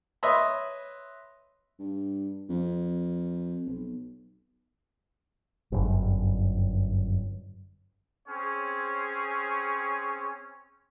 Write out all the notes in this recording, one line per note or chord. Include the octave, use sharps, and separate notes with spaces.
B4 C#5 D#5 E5 B5 C6
G2
F2
B1
G1 F#2
C4 C#4 G#4 C#5